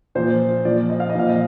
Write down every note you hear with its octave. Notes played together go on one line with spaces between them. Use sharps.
A#2 F3 C5
A#2 F3 D5
D#5
F5
D#5
A#2 F3 F5
D#5